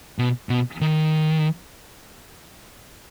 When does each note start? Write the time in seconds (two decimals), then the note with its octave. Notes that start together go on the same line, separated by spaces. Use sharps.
0.19 B2
0.49 B2
0.81 D#3